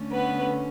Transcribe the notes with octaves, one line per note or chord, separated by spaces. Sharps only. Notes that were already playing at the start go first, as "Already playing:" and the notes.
Already playing: D3 A3 C#4
B3 B4